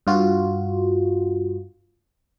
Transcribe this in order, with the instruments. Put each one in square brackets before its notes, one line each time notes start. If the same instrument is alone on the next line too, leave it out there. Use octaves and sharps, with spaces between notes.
[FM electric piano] G2 F4 F#4